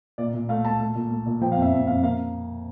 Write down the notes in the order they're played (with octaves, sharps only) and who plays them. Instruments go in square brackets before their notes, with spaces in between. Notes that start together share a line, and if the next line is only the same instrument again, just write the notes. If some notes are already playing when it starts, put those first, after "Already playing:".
[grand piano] A#2 D5
A#2
A3 F5
A3 A5
A3
A#2
A3
A#2
F3 G5
F5
F2
E5
F2
F2 F5
A#3 F5